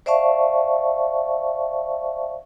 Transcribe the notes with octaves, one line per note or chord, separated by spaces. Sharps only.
C5 D5 E5 F5 A5 C#6